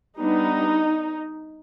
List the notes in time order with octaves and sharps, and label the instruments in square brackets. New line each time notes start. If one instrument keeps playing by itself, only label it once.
[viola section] G3 B3 D4 D#4